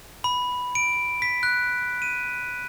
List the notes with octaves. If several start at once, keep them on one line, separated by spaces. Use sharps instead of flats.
B5
D7
B6
F#6
D#7